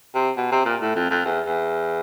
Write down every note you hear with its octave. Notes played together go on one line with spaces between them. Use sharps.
C3
B2
C3
A#2
A2
F2
F2
E2
E2